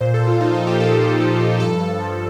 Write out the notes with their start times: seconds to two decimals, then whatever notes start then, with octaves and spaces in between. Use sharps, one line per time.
0.01 A#2 C5
0.14 A4
0.20 A#2
0.27 F4
0.40 F3 D#4
0.54 D#4
0.60 F3
0.67 G4
0.80 A#2 A4
1.00 A#2
1.20 F3
1.40 F3
1.60 G2 A4
1.80 G2
2.00 F3